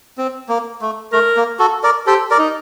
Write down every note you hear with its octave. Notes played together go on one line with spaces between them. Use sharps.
C4
A#3
A3
A3 A#4
A#3
F#4 A4
A#4 D5
G4 A4 C5
A#4 D5
D#4